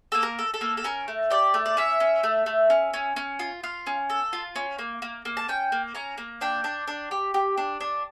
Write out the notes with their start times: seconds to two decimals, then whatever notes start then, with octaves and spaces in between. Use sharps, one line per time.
0.12 A#3 A4
0.23 A#4
0.39 A4
0.54 A4
0.61 A#3
0.77 A4
0.84 C#4 A#4
1.08 A3
1.30 G4 D5
1.54 A3
1.66 D5
1.77 C#4 E5
2.00 C#4
2.23 A3
2.46 A3
2.70 C#4
2.94 C#4
3.16 C#4
3.39 F4
3.63 F4 F5
3.87 C#4
4.10 A4
4.33 F4
4.56 C#4
4.79 A#3
5.02 A#3
5.25 A#3
5.37 A5
5.48 C#4 G5
5.72 A#3
5.95 C#4 A#5
6.18 A#3
6.41 D4 G5
6.64 D4
6.88 D4
7.11 G4
7.34 G4
7.58 D4
7.81 D4